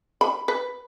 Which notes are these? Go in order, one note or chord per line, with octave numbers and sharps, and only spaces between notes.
B5
B4